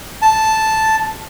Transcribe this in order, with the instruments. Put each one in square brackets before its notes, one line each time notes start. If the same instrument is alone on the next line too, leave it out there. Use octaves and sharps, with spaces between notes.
[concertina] A5